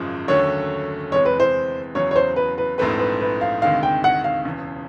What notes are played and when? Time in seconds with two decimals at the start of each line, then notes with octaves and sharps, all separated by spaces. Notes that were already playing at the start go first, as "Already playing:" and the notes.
Already playing: G#1 F#2 C#3 F3 G#3
0.28 D#2 D3 F#3 A3 C#4 C#5
1.12 E2 C3 E3 G#3 C#5
1.25 B4
1.40 C5
1.95 E2 C#3 F#3 B3 C#5
2.11 C#5
2.16 C5
2.36 B4
2.58 B4
2.78 A#1 G#2 E3 A3 C4 B4
2.99 B4
3.21 B4
3.41 F5
3.62 D2 C3 D#3 G#3 F5
3.83 G5
4.04 F#5
4.24 F5
4.45 E1 E2 C#3